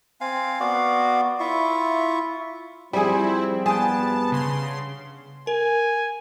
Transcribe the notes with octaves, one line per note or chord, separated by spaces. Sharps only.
C4 F5 G#5
B3 F#4 D5 F5
E4 F4 E5 C#6
F3 G3 C4 E4 G#4
G2 B3 G#4 G5 A5
C#3 C6
A#4 G#5